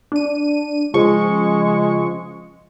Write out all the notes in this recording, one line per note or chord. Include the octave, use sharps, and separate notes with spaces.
D4 D#7
C#3 F3 G#3 C#6